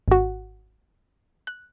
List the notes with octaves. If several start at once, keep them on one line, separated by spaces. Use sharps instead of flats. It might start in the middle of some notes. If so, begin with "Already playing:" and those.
G#1 F#4
F#6